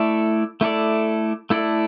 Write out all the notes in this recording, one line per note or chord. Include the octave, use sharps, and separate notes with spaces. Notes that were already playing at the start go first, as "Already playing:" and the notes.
Already playing: A3 E4 A4 D5
A3 E4 A4 D5
A3 E4 A4 D5